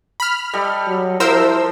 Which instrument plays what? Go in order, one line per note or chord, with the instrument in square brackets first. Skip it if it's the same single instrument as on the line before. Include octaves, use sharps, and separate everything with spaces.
[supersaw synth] B5 F6
[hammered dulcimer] G3 A4 D#5
[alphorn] F#3
[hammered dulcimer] F3 [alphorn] E4 [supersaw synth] A#4 C5 E6